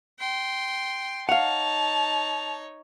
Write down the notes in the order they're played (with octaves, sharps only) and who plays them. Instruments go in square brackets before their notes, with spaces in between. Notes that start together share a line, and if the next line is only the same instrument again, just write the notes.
[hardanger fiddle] G5 C6
[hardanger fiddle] D#4 C#5 [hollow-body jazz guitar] F5 F#5 [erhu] A5 [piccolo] F7